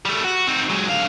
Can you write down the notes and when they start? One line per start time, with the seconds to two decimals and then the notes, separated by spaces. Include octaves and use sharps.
0.05 G3 A3
0.24 F#4
0.47 C4 D#4
0.69 F#3 G#3
0.88 D3 F5